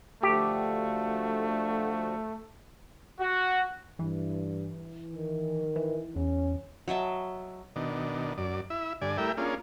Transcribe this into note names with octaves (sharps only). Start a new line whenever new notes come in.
D3 F3 A3 F#4 G4
F#4
G2 E3
D#3
E3
E2 C#4
F#3 D#5 E5 A5
B2 D#3 D4
F#2 D5
E4 E5
G2 D3 D5 G#5
G3 A3 E4 A#4 E5 G5
A#3 C#4 D4 F4 G#4